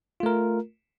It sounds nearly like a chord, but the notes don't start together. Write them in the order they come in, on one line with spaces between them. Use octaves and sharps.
F4 A3 A#4